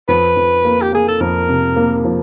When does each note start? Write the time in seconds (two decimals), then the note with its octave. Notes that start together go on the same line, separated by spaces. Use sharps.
0.08 F2 B4
0.37 F2
0.65 A#3
0.82 G4
0.92 A#3 G#4
1.08 A4
1.21 F2 A#4
1.49 C3
1.76 A#3
2.04 F3